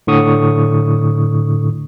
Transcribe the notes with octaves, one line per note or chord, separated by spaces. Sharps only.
A2 D3 C#6 D#6